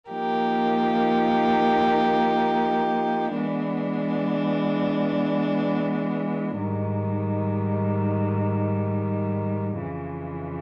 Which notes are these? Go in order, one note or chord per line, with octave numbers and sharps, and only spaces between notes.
F3 A#3 D#4 G4 A#4
E3 G#3 B3 D4
G#2 D#3 G3
F2 C#3 E3